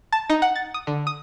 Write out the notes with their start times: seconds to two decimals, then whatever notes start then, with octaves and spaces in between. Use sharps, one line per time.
0.13 A5
0.30 D#4
0.42 F#5
0.56 A6
0.74 D#6
0.87 D3
1.07 D#6